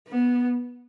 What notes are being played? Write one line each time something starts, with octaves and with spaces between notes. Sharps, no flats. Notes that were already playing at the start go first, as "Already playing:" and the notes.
B3